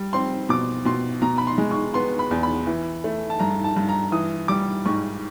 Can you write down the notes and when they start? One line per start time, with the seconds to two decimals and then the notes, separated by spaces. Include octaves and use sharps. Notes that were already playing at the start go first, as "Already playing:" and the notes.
Already playing: G3
0.13 C4 C6
0.49 B2 D6
0.85 B2 C6
1.22 B2 A#5
1.38 B5
1.47 C6
1.58 G#3
1.71 C#6
1.94 B3 C6
2.19 B5
2.31 E2
2.43 B5
2.67 E3
3.04 A3
3.30 A5
3.39 G2 A#5
3.64 A5
3.76 G2
3.88 A#5
4.12 E3 D#6
4.48 G3 D6
4.86 G#2 C#6